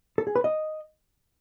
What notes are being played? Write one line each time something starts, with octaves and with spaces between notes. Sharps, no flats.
A4
G#4
B4
D#5